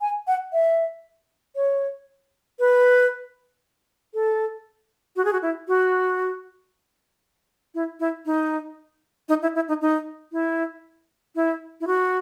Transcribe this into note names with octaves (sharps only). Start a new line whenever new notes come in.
G#5
F#5
E5
C#5
B4
A4
F#4
G#4
F#4
E4
F#4
E4
E4
D#4
D#4
E4
E4
D#4
D#4
E4
E4
E4
F#4